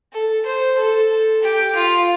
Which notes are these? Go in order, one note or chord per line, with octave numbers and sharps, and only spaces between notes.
A4
C5
A4
G4
F4